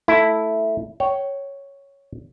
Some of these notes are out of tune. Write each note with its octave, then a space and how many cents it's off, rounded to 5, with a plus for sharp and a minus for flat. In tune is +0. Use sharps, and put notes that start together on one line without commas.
A3 +0 E4 +0
C#5 +0 G5 -25